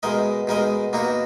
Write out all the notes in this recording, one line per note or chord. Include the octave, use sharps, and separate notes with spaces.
B2 G#3 D#4 A#4 D#5
B2 G#3 D#4 A#4 D#5
B2 A#3 D#4 F#4